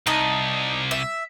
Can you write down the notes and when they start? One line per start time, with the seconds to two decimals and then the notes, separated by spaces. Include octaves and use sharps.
0.07 C2 D#4 D#5 A5
0.91 E5